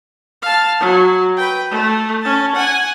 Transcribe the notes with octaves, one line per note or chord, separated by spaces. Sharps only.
F5 A5
F#3
B4 G5
A3
C#4 A5
F#5 G#5